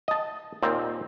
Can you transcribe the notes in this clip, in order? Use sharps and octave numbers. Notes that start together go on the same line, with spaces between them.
D#5 A5
D#2 A#2 C4